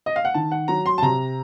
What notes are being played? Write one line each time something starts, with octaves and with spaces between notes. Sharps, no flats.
D#5
F5
F#5
D#3 A5
F#5
F#3 A#5
C6
A5
C3 A#5